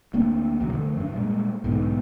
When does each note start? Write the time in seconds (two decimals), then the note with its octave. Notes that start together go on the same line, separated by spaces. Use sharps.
0.14 D2 A#3 C4 D4
0.60 B1 E2 C#3 F#3
0.73 D3 F3 A3
0.97 F#2 D4
1.12 A#2 G3 G#3
1.64 B1 G#2 B2 D3